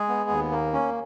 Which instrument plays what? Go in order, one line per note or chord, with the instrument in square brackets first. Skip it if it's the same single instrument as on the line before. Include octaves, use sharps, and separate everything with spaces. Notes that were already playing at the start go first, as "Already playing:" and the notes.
Already playing: [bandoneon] G#3 G#4
B3
D#2
A#3
C#4